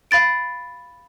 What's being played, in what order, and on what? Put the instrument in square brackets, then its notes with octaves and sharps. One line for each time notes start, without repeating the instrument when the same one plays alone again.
[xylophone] F5 B5 A6 D7